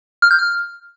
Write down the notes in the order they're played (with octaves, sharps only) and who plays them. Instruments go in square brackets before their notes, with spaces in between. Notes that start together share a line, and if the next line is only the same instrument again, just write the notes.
[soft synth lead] F6
G6
F6